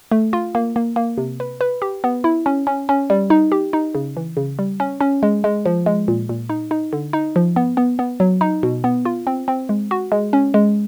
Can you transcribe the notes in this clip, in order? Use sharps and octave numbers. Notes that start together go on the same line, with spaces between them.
A3
F4
A#3
A#3
A#3
C3
B4
B4
G4
B3
E4
C#4
C#4
C#4
G3
D#4
G4
D#4
C#3
E3
C#3
G3
C#4
C#4
G#3
G#3
F3
G#3
A#2
A#2
D#4
D#4
D3
D#4
F3
B3
B3
B3
F#3
D#4
B2
B3
F4
C4
C4
G#3
F#4
G#3
C#4
G#3